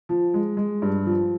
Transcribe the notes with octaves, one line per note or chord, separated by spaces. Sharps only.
F3
G#3
G#3
G2
F3